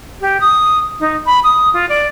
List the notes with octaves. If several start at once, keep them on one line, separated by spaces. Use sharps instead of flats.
G4
D#6
D#4
B5
D#6
F4
D5